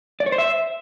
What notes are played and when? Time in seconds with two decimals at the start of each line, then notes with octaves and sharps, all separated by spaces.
0.20 D5
0.26 C#5
0.32 C5
0.38 E5